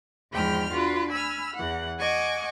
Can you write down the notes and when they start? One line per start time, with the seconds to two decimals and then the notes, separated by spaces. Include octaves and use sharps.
0.33 E2 G#2 F3 G5 B5 F6
0.74 D4 F4 F#4 B4
1.11 G#5 B5 E6 F6
1.56 E2 E3 F#5
1.99 D#5 F#5 G#5 C#6 D6